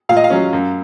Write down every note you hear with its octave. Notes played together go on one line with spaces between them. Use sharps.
A#2 F5
D#5
F5
F#3 C#4
F#2